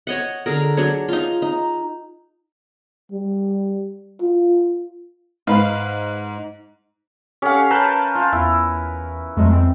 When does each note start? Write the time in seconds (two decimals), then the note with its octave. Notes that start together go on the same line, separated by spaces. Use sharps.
0.07 C#5 D#5 F#5
0.46 D3 G#4 A#4
0.77 F#3 D4 G#4 C#5
1.08 D#4 F4
1.42 D#4
3.12 G3
4.22 F4
5.47 G#2 B4 F5
7.42 C#4 G4 A4 F5 F#5
7.70 A#4 B4 A5 G6
8.15 F4
8.32 E2 E4
9.37 F2 F#3 G#3 A3
9.52 C4